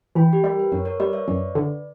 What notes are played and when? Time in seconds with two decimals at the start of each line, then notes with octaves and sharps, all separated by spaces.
0.15 E3 G5 B5
0.33 G4
0.44 G3 A#4
0.59 B4
0.72 F#2 A#4 C#5
0.85 A#4 C#5
1.00 G3 B4 D5
1.13 C#5 E5
1.28 F#2 B4 D5
1.55 D3